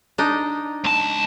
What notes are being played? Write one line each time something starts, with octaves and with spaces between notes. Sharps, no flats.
D4 D#4 D#5
C#2 A5